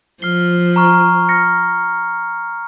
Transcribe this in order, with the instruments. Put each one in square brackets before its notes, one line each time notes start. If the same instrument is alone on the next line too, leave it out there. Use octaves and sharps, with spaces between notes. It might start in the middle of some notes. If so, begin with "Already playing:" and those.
[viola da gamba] F3 [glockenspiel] F6 C7 G7
[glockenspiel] A#5 C#6 F6
F6 A#6 C#7